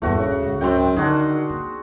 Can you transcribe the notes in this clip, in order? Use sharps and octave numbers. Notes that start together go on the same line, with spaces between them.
D#1 E2 G2 A3 F#4
C#3
C#2 G#2
F#2 C4 G5
D3 D#3 D4 F#4 G#4
A#3